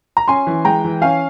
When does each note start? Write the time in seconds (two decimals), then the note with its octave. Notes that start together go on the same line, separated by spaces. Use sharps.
0.17 A#5
0.28 C#4 G#5 C6
0.47 E3
0.65 G#3 G5 A#5
0.84 E3
1.02 C#4 F5 G#5